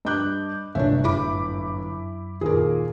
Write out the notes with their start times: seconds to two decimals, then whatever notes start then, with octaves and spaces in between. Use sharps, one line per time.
0.05 G2 D#5 D6 F#6 G6
0.75 G1 A2 C3 G3 A#3 D4 C#5 E5
1.04 F#2 E4 B5 D6
2.41 D#2 A#2 G#4 A#4